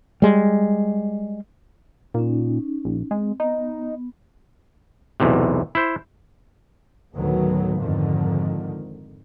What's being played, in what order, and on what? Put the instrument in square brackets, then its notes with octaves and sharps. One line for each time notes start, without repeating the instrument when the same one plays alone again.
[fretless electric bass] G3 G#3
[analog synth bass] A#2 [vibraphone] C#4 D#4
[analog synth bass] A#1
[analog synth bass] G#3 [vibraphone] C4
[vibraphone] B3 [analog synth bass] D#4
[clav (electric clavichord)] B1 E2 A2 C3
E4 C5
[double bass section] D2 A2 D#3 F#3 B3
F2 G#2 D3 D#3